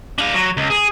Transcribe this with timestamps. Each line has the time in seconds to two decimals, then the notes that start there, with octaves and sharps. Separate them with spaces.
0.19 D4 F5
0.34 F#3
0.57 C#2
0.70 G#4